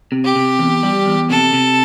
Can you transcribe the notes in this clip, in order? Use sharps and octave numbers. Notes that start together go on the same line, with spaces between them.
C3
G4
C3
E2
G3
E2
C3 A4
C3